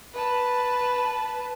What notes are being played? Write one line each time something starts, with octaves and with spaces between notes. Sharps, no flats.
B4 A5